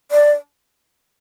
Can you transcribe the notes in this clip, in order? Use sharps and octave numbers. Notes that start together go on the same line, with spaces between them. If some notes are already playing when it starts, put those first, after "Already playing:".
D5